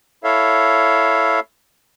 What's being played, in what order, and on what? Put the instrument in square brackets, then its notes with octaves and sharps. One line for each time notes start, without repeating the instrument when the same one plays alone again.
[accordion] E4 A4 C#5 E5 F5